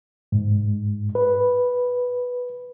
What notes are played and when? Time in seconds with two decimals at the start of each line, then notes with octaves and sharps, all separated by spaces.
0.32 G#2
1.15 B4